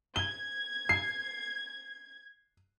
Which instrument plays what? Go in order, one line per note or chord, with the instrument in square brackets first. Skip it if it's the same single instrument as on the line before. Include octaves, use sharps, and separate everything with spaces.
[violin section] G#6 [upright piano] G7
[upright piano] C7